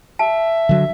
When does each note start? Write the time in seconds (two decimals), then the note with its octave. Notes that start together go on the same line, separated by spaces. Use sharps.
0.19 E5 A5
0.69 D3 F#3